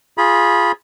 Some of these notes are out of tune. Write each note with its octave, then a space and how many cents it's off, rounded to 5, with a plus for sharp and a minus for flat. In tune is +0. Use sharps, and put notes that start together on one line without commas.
F4 +0 G#4 -5 B5 -25